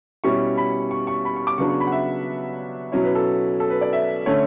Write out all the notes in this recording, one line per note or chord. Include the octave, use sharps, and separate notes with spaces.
B2 G3 C#4 E4 C#6
B5
C#6
C#6
B5
C#6
D6
C#3 F#3 B3 D4 C#6
C#6
B5
F#5
E5
B2 F#3 C#4 E4 C#5
B4
A4
A4
B4
D5
E5
D3 A3 C#4 C#5